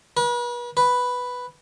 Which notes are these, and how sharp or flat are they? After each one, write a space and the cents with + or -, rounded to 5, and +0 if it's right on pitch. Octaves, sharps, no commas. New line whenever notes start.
B4 -40
B4 +0